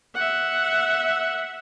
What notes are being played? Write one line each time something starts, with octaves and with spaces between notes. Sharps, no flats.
E5 F#5